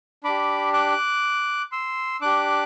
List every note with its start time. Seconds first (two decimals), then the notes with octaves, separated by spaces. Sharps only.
0.24 D4 G4 B5 D6
0.73 D6 F#6
1.72 C6 E6
2.22 D4 G4 D6 F#6